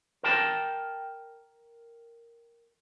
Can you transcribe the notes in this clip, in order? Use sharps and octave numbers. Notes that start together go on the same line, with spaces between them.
A#4 G5 A5